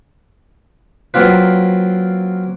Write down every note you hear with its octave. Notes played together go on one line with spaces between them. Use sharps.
F#3 A#3 C4 F4 B4